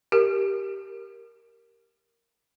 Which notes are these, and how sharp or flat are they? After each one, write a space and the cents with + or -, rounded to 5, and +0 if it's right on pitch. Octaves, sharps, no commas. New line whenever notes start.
G4 +0 A#4 +0